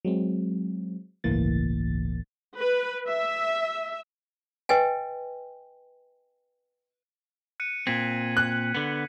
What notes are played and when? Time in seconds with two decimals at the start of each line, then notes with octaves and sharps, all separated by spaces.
0.05 F#3 G#3 C4
1.24 G1 C#2 A2 E3 A#3 A6
2.59 B4
3.10 E5
4.69 B4 D#5 G5 G#5
7.60 F#6 C#7 D#7
7.87 A#2 C4 G#6 B6 F#7
8.37 F#6
8.75 D3 B3